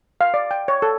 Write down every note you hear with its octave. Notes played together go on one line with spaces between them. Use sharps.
F5
D5
G5
C#5
A4